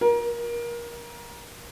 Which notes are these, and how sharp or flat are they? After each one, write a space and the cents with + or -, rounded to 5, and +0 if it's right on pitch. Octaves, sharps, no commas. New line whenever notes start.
A#4 +25